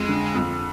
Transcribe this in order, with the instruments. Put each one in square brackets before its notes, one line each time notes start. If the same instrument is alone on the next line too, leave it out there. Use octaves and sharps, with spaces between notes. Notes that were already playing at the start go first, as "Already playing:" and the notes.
Already playing: [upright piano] F2 [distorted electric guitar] G#3
[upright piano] D3
F2